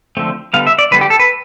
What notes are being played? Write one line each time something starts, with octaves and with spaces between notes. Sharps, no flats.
D3 F3 A3 C4
D3 G3 B3 F5
E5
D5
D3 G3 B3 B4
G4
A4
B4